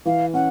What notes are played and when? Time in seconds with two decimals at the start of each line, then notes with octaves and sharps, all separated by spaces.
0.06 E3 F5
0.34 C#4 F#5